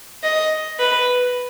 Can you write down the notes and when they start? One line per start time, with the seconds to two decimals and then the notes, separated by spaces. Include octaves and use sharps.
0.23 D#5
0.80 B4